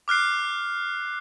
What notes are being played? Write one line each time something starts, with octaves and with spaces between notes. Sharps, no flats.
D6 F6 F#6 C7